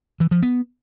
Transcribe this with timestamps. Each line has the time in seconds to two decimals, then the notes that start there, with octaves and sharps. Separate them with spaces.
0.20 E3
0.31 F3
0.42 B3